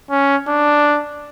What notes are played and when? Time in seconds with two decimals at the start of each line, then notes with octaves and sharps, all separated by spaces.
0.11 C#4
0.48 D4